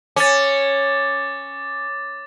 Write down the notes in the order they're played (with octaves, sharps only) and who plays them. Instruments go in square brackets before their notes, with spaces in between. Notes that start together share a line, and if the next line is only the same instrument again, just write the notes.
[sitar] C#4 [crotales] D6 A6